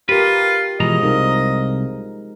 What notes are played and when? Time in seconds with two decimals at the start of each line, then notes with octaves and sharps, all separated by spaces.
0.09 F4 G4 A#4 B4
0.80 B2 E3 F3 G#3 D#5 A#5
1.03 C2 D#4 A#4